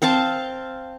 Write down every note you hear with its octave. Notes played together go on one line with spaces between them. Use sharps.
C4 C5 F5 A5